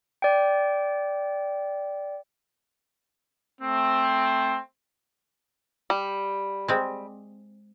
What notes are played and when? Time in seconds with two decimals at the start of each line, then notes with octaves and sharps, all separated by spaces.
0.22 D5 G5
3.61 A3 C4
5.90 G3
6.68 G#3 C4